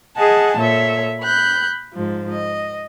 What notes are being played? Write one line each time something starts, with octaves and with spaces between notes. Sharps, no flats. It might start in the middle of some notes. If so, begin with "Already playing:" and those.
G#4 D#5 F#5 G#5 A5
A#2 A4 C#5 E5
B5 F#6 G6
G#2 F3
D#5